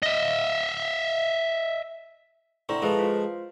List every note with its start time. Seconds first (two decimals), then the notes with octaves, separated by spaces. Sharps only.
0.03 D#5 E5
2.69 D3 C4 E4 A#5 C#6
2.82 F3 G#3 A4 B4 A5
2.99 F4 C5 F5